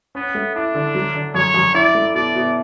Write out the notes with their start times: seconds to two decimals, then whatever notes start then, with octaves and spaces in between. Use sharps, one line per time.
0.15 B3 C#4
0.35 A3
0.55 D4 E4
0.75 D3
0.95 F#3
1.15 D3
1.35 F#2 C#5
1.54 F#2
1.75 E4 D5
1.95 A3
2.15 B2 D5
2.35 B2